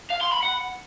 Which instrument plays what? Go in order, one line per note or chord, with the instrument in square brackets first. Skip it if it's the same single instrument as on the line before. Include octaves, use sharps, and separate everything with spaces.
[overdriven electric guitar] F5
C6
B5
F#5